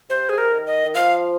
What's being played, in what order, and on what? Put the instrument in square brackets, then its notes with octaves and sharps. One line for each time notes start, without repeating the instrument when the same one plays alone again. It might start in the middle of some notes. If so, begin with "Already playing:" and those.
[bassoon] C3 [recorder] C5
[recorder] G#4
A#4
[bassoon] D#3
[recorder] D#5
[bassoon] D#3
[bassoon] F3 [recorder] F5